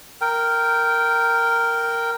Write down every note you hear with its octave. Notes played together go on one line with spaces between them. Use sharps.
A#4 G5